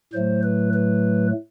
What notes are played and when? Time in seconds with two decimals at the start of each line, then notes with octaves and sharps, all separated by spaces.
0.13 A2 F#3 A3 C5
0.43 B4
0.73 B4